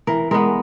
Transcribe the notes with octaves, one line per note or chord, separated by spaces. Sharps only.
E3 A#4
G#3 B3 A#4